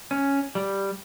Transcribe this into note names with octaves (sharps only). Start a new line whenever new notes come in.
C#4
G3